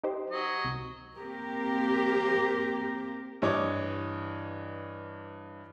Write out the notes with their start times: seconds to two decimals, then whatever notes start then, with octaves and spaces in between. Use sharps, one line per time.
0.04 D#4 G4 C5
0.30 F#3 D#5
0.65 C2
1.18 A#3 C4 G4 A#4
3.42 G2 E3 C#5 D#5 D6